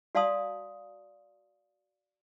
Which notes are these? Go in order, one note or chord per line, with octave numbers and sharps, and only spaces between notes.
F#4 D5 F5 A5 C6 D#6